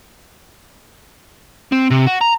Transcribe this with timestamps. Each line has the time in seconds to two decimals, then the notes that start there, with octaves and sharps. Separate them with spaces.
1.72 C4
1.91 C3
2.07 F#4
2.21 A#5